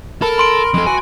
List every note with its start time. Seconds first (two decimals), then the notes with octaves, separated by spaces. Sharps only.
0.22 A4 A#4 B5
0.38 B5 C6 D7
0.74 F2 G#3 A4
0.87 E3 F#4 G#5